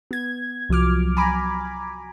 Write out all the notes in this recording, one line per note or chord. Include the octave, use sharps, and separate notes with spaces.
B3 G#6
C2 F3 F#3 D6 F6
G#5 A#5 B5 D6